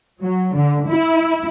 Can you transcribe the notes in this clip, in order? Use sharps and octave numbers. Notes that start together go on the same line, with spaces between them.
F#3
D3
E4